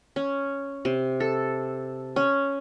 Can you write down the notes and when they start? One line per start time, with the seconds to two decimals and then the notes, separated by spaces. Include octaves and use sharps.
0.16 C#4
0.85 C3
1.20 A4
2.16 C#4